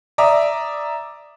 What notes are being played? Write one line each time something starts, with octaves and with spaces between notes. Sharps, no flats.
D5 E5 A#5 D6 D#6